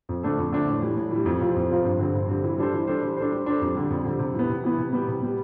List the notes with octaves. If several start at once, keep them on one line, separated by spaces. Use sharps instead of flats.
F2
D3 A3 D4 A4
F2
D3 A3 D4 A4
A2
E3 G3
A2
E3 G3
F2
C3 F3 C4 F4
F2
C3 F3 C4 F4
G2
D3 G3 C4
G2
D3 G3 C4
E3
G3 D4 A4 C5
E3
G3 D4 A4 C5
G3
D4 A4 C5
G3
D4 A4 C5
F2
D3 G3
F2
D3 G3
C3
E3 B3
C3
E3 B3
C3
G3 B3
C3
G3 B3